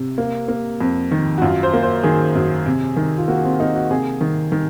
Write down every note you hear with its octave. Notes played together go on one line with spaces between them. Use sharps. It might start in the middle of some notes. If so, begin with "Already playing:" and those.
Already playing: C3
A#3
A#3
F2
D#3
F#4
F#2 F4
C5
A#3
C5
D#3 G#4
F#2
C3
D#3
F4
A#3 F#4
C4
A#3 D#4
F#4
C3 G#4
D#3
D#3